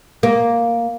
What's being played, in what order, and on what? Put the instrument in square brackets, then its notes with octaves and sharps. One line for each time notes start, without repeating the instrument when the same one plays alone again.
[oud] A#3